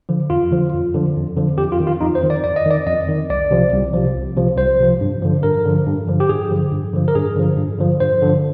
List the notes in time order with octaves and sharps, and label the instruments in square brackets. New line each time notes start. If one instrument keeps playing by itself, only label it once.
[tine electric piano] D3 F3
F2 F4
D3 F3
F2
D3 F3
F2
D3 F3
F2 G4
F4
D#3
F4
F2 D#4
C5
D#3
D5
F2 D5
D#5
D#3 D5
F2 D#5
D#3
C2 D5
C3 F3
C2
C3 F3
C2
C3 F3
C2 C5
C3 F3
G2
D3 F3
G2 A#4
D3 F3
G2
D3 F3
G4
G2 G#4
D3 F3
G2
D3 F3
A#4
G2 G#4
D3 F3
G2
D3 F3
G2 C5
D3 F3